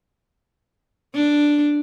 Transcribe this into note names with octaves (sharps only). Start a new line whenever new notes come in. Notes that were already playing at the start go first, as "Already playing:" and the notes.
D4